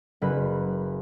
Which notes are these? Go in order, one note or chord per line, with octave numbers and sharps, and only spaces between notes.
F#1 B4 B6